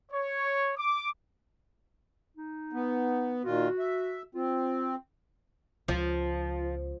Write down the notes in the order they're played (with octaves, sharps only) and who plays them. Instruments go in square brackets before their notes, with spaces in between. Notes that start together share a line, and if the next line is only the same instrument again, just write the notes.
[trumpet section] C#5
D6
[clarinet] D#4
[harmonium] B3
[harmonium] A#2 D#3 F4 [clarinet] F#4
[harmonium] E5
[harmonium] C4 [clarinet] F4
[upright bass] C#2 [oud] F3